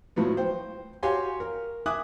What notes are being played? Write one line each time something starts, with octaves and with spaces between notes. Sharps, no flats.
A2 F3 F#3 B3
C5 G5
F#4 G4 C#5 F5 G#5 C6
A#4
E5 G#5 D6 D#6 F#6